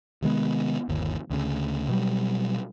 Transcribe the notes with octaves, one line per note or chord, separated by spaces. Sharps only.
C3 D#3 G#3 B3
G1 D#2
D2 C#3
B2 F#3 G3